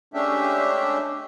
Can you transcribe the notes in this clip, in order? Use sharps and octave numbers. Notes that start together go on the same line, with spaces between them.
G#3 A3 C#4 D4 G4 E5